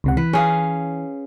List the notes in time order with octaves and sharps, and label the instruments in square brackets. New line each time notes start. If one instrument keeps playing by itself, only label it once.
[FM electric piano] C#2 C3 F#5
[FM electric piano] E3 [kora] B4
[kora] C#4 G#4 F5